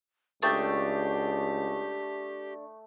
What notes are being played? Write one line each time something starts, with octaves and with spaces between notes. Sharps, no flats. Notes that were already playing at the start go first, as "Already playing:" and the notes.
C#2 A3 D4 G4 G5 D#6